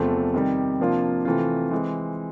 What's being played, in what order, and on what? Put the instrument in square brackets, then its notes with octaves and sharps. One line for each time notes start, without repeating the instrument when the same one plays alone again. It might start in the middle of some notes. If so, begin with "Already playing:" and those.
Already playing: [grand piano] E2 C3 F3 A3 C4
C3 D#3 G3
C3 F3 A#3 D4 F4
C3 E3 A3 C4 F4
E3 G#3 C4